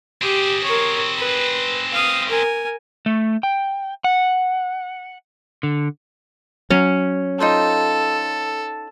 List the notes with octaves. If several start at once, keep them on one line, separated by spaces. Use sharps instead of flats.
C4 G4 G#4
A#4 C#5
B4
F5 D#6
A#4 G#5
A3
G5
F#5
D3
F#3 C#4
D#4 F4 A4 C5